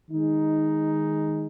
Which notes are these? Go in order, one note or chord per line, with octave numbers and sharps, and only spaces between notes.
D#3 G#3 D#4